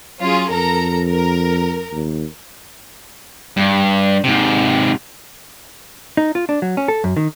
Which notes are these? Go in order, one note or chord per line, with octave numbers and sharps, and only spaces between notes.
F#3 C#4 F4 G#4
F2 A4 A#4 A#5
A#4
D#2
G2
G#2 C3
D#4
F4
D4
F#3
C#4
A4
F#2
D#3